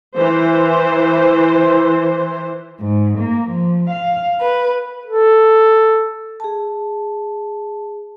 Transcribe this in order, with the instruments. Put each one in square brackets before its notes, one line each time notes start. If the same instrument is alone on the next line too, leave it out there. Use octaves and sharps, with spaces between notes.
[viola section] E3 C5
[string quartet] G#2
A#3
F3
F5
B4
[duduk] A4
[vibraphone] G#4 A5